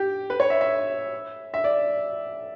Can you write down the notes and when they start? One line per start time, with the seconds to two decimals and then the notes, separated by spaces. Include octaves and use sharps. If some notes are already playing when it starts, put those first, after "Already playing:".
Already playing: G4
0.30 B4
0.40 C#5
0.50 E5
0.61 E5
1.54 E5
1.64 D5